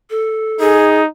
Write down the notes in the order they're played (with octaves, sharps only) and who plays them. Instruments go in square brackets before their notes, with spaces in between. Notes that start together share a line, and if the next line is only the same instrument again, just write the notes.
[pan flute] A4
[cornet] D#4 [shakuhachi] G#4